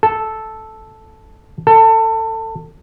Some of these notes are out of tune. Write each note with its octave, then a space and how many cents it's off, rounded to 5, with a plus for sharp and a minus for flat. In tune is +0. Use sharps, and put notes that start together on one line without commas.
A4 -5
A4 +25